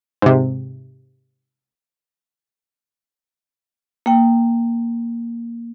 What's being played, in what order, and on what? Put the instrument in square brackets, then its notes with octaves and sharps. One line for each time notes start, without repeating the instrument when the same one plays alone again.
[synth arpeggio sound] G#2 C3
[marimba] A#3 G5